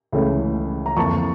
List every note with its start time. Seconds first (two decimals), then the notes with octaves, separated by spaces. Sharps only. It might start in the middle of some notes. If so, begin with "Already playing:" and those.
0.12 C#2 C#3 E3 A3 C#4
0.86 A#5
0.97 F2 E3 A#3 A5 C#6